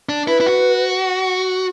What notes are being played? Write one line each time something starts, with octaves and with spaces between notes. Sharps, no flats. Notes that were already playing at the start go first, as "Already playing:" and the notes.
D4
E4 B4
E4
F#4